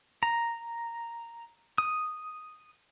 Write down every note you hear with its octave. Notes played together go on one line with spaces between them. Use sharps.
A#5
D#6